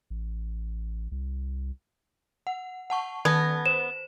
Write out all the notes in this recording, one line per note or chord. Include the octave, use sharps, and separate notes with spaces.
A1
C2
F#5
F#5 A5 C#6
D#3 B3 A5 G#6 A#6
C5 E7